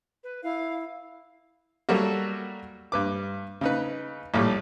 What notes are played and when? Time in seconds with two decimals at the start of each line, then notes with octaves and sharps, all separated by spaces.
0.23 B4
0.43 E4 F5
1.89 F#3 G3 A3 A#3 F#4
2.92 G2 B4 D6
3.61 C#3 D#4 B4
4.34 A#1 A2 G3